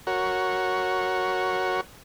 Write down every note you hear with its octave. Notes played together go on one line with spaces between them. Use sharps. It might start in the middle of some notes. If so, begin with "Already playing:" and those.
F#4 A#4 C#5